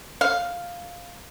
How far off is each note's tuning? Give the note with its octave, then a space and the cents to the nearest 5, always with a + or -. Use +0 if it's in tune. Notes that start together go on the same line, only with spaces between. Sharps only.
F5 +5